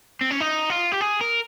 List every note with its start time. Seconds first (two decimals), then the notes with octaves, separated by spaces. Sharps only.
0.21 C4
0.31 C#4
0.41 D#4
0.70 F4
0.92 G4
1.01 G#4
1.21 A#4